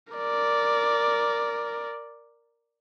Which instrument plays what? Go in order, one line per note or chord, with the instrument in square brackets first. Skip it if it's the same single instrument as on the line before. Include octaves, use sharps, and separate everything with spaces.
[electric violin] A#4 D5